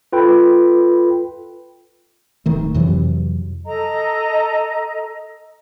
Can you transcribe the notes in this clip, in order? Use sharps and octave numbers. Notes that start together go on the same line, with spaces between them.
F4 A4 B4 G5 B5
D1 D#3 A3
F2 C3 E3 F#3
A4 D#5 A#5